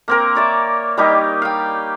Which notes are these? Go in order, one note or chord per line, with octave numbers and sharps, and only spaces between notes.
A#3 C4 A#4
C#5 D5 E5
G3 A#3 D#4 G4
F5 G5